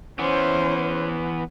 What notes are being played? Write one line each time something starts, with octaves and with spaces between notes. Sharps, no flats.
E3 B3 C#4 C5